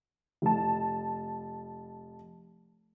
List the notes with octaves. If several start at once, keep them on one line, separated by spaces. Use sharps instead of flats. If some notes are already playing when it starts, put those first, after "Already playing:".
F1 A5